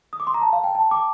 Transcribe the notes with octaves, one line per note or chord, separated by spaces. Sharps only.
D#6
D6
C6
A#5
A5
F5
G5
A5
D6